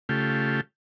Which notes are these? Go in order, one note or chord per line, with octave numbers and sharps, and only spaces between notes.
C#3 A3 F4 G4